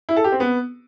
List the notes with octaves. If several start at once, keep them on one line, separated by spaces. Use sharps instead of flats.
E4
A4
G4
C4
B3